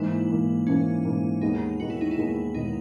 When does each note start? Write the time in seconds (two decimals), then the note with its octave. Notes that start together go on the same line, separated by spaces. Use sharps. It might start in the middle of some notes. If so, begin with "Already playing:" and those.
Already playing: G#2 E3 A#3 E4
0.29 G#2 E3 A#3
0.66 G#2 E3 A#3 C#4
1.05 G#2 E3 A#3
1.41 D#2 D#3 G#3 B3 D#4
1.80 D#2 D#3 G#3 B3 F#4
1.90 E4
2.01 D#4
2.11 E4
2.18 D#2 D#3 G#3 B3
2.55 D#2 D#3 G#3 B3 D#4